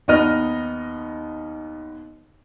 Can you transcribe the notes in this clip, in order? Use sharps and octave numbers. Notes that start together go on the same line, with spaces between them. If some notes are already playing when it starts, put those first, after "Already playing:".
D#2 B3 D#4 D#5 F6